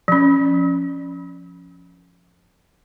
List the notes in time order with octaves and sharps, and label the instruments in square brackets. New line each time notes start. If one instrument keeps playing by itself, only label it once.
[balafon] F3 C#4